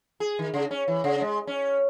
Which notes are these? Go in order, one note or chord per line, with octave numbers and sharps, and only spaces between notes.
G#4
D#3
C#3
C#4
E3
C#3
G#3
C#4